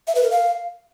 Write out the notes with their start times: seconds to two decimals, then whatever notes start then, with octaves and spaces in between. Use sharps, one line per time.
0.07 E5
0.15 B4
0.23 A#4
0.31 F5